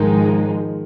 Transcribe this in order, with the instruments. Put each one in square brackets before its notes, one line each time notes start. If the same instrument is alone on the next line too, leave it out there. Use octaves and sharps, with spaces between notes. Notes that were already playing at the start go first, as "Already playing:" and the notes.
Already playing: [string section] G#1 G#2 F3 G#3 D#4 [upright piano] D#3